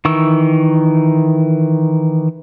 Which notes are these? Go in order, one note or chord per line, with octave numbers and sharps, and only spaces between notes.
D#3 E3 C#6 E6